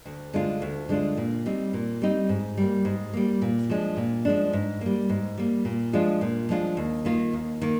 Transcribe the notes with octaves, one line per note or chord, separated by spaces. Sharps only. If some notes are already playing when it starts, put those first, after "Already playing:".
D2
D3 G#3 D4 F4
D2
D3 G#3 D4 F4
A#2
G3 C4 D#4
A#2
G3 C4 D#4
G#2
G3 A#3
G#2
G3 A#3
A#2
F3 G#3 D4
A#2
F3 G#3 D4
G#2
G3 A#3
G#2
G3 A#3
A#2
F3 G#3 D4 F4
A#2
F3 G#3 D4 F4
D#2
D#3 A#3 F4
D#2
D#3 A#3